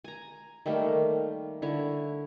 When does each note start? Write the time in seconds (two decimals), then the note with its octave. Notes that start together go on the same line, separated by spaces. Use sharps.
0.04 G#5 A#5
0.66 D#3 G3 A3 A#3
1.62 D3 E4 C#5